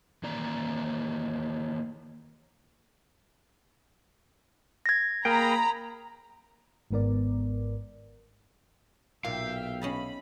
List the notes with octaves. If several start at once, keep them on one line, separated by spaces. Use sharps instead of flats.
D#3 E3 A#3 D5 A#5
G#6 A#6
A#3 G#4 A#4 G5 A#5 B5
G#1 G#2 B3 A#4 D5
B1 A#2 E5 F5 G5
C#4 D#5 A5 B5